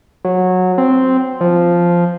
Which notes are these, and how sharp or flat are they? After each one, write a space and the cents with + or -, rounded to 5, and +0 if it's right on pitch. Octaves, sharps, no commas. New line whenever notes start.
F#3 -15
C4 -5
F3 -5